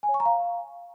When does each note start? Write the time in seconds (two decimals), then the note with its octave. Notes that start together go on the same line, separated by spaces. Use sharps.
0.03 G#5
0.09 C#5
0.14 C#6
0.20 A#5
0.26 F5